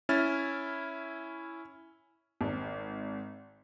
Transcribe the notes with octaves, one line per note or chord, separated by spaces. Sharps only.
C#4 E4 F6 A6
G#1